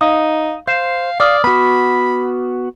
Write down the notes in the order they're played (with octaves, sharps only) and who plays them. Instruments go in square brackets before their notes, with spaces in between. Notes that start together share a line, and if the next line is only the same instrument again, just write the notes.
[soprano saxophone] D#4 [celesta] F5 [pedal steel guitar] D#6
[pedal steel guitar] C5 [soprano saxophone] F5 [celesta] G6 C7 E7
[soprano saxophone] D5 [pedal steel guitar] F5 [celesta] D6 D#6 F6
[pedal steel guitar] B3 F#4 [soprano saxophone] B5